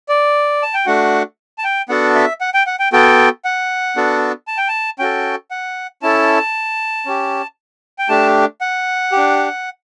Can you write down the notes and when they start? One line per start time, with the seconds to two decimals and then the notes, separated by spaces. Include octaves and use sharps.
0.09 D5
0.63 A5
0.74 G5
0.86 A3 D4 F#4 F#5
1.58 A5
1.64 G5
1.89 B3 D4 F#4 A4 F#5
2.15 E5
2.41 F#5
2.54 G5
2.67 F#5
2.79 G5
2.93 B3 F#4 A4 G5
3.45 F#5
3.97 B3 D4 F#4 A4
4.48 A5
4.58 G5
4.68 A5
4.99 C#4 F#4 A4 G5
5.51 F#5
6.02 C#4 E4 A4 A5
7.06 C#4 G4
7.99 G5
8.09 A3 D4 G4 A5
8.61 F#5
9.12 D4 G4